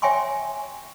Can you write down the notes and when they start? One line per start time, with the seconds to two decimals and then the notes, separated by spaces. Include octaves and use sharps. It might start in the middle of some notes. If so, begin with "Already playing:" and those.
0.02 C#5 E5 G5 G#5 C6 C#6